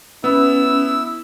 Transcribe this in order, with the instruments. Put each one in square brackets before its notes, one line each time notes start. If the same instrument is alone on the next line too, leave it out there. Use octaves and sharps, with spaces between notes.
[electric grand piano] B3 [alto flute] C#4 [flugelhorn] E4 [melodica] E6